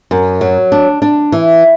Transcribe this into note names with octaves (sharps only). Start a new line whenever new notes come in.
F#2
F#3
D4
D4
E3